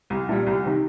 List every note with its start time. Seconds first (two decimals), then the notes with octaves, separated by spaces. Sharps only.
0.10 C2
0.29 A#2 G3
0.46 C2
0.65 C3 D#3